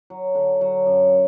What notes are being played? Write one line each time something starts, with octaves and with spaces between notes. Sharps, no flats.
F#3
D3
F#3
F#2